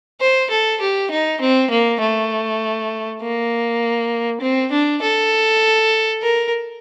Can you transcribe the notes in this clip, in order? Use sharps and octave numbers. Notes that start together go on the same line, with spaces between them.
C5
A4
G4
D#4
C4
A#3
A3
A#3
C4
D4
A4
A#4